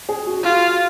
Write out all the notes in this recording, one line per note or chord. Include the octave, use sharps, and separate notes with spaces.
G#4
F#4
F4 F#4